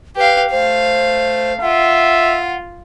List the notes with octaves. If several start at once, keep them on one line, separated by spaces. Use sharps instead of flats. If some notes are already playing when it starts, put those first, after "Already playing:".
G4 B4 F5
A3 C5 F5
F4 E5 F#5